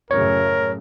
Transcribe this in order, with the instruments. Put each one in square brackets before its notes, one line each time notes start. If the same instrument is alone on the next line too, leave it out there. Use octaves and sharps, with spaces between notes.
[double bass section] F#2 A2 C#3 [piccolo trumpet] A#4 [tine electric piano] C#5